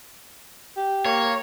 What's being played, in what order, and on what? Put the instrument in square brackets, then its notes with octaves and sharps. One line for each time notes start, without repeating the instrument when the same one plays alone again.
[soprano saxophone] G4
[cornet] A#3 [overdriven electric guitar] C#5